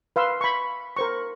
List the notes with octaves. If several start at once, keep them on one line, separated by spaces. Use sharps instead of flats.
B4 F5 C6 E6
B5 C#6
A#4 C5 C#6